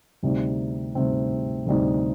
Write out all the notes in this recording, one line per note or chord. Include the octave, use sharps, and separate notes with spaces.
D2 C3 G3 C4 D#4
D2 C3 G3 C4 D#4
D2 C3 G3 C4 D#4